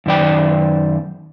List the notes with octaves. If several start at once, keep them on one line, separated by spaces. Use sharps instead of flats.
F#2 D#3 D5 G5